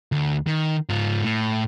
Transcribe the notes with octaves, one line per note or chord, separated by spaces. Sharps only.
D2
D#3
G#2 F4
A2